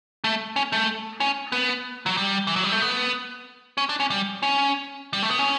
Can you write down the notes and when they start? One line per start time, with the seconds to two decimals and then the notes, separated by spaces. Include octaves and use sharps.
0.24 A3
0.56 C#4
0.72 A3
1.20 C#4
1.52 B3
2.06 F#3
2.17 G3
2.47 E3
2.56 F#3
2.64 G3
2.72 A3
2.82 B3
3.78 C#4
3.89 D4
4.00 C#4
4.10 G3
4.43 C#4
5.13 G3
5.22 A3
5.31 B3
5.39 C#4